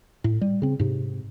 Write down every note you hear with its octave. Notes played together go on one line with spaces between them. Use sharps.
A2
G3
C#3 C4
G#2 C3